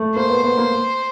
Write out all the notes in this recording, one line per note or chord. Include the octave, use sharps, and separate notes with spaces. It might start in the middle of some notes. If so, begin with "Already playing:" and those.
Already playing: A3
A#3 C5
B3
B3
A#3